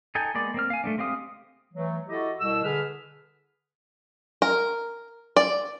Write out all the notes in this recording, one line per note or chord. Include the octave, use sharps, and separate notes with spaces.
D#4 A4 G5 G#5
G#3 A#3 B3 D5
A#3 C4 F6
F5 G#5
A3 B3 D4
G#3 C4 G4 F5 D#6
E3 F#3 A3
E4 F#4 G4 A4 D#5
C2 B2 E6
D3 G#4 B4 F6
A#4
D5